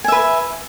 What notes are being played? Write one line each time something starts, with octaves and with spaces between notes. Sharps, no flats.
B4 E5 G#5